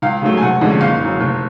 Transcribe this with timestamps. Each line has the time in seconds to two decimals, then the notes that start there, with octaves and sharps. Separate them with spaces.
0.02 C#2 F5
0.22 C#3 F#3 A3
0.37 G#5
0.42 F1 F#5
0.61 F2 D3 G#3 C#4
0.81 F#1 F5
1.00 F#2 C#3
1.20 F1